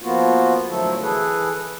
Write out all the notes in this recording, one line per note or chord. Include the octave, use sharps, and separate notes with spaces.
F3 A#3 B3 F4 F#4
D3 F3 F#3 A3 E4 A4
E3 G#4 A4 B4